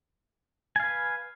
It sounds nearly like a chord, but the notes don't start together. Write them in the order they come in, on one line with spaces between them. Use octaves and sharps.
G#5 F5 B4